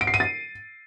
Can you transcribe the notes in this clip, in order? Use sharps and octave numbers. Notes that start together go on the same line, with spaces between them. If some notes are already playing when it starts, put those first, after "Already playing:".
D7
C7
D#7
A6